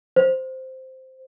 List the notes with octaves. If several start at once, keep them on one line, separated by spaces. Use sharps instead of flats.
C5